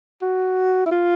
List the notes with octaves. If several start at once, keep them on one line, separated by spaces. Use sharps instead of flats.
F#4
E4
F4